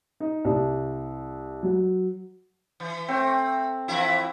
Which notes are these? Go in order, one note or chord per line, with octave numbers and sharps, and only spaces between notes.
D#4
C2
F#3
E3
A3 C4
E3 F3 E4